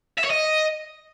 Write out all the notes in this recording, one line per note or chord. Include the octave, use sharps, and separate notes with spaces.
E5
C#5
D#5